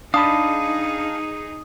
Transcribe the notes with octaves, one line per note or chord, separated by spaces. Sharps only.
D4 D#4 G#4 F5 A5 B5 D#6